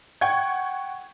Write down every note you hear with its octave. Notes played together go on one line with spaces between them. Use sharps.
F#5 G5 C#6 G#6